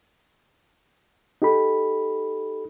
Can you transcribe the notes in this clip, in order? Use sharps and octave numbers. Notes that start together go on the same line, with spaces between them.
D#4 G4 A4 B5